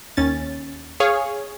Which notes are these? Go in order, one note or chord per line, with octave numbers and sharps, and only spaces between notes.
D#2 C#4 A6
G#4 C#5 F5